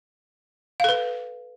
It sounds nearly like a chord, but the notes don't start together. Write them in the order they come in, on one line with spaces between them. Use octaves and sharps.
F5 A4 B4